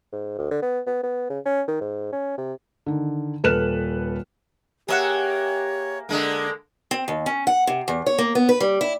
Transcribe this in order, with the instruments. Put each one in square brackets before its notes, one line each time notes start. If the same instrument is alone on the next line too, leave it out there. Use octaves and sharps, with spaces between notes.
[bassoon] G#2
D2
D3
B3
B3
B3
C#3
C#4
D#3
G#2
C#4
C3
[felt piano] D3 D#3
D#1 A4 B4 F6 F#6 E7
[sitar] A#3 [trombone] G4 [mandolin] G#4 E5 F#5 [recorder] C#5
[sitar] D3 G#3 A#3 [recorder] D4
[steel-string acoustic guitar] C4
D#2
C#4
F#5
C3
E2
C#5
A#3
B3
B4
G3
E4